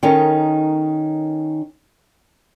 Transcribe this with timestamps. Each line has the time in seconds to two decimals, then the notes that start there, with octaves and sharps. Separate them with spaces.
0.03 D#3 C#4 D#4 A4 A#4